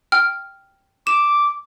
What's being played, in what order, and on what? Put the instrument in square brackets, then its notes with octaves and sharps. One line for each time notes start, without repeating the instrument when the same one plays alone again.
[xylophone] G5 F6
[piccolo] D6 [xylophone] E7